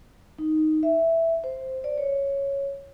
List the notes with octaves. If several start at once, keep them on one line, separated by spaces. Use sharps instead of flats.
D#4
E5
C5
D5
C#5